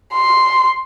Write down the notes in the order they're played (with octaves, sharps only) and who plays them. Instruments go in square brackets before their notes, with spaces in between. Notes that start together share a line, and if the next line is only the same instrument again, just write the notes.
[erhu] C6